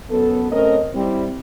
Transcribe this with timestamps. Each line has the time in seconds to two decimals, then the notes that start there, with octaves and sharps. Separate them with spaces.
0.10 F#2 B3 A4
0.52 A3 C4 C#4 A#4 C#5 D#5
0.95 G3 C4 E4